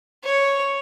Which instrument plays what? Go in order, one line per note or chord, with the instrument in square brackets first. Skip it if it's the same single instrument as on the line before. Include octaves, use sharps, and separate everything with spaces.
[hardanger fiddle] C#5